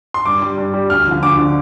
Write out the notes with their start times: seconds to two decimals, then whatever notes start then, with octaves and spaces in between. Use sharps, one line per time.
0.14 C6
0.26 G2 D6
0.42 G3
0.58 G2
0.74 G3
0.90 D2 F6
1.07 D3 F3
1.23 D2 D6
1.38 D3 F3